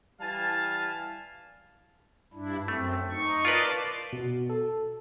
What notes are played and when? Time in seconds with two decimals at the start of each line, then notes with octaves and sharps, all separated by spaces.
0.20 E3 G3 F5 G#5 A5
2.34 G2 D4 E4
2.68 F#2 A3 C4
3.10 D#4 C#6
3.45 F4 A#4 B4 D5 A5 C6
4.13 B2
4.50 A4